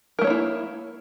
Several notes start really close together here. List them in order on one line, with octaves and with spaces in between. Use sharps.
A#4 A3 C#5 A#3 E4